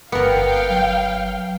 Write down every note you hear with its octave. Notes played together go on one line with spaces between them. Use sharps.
G1 B3 A#4 F5 G5 C#7
F#3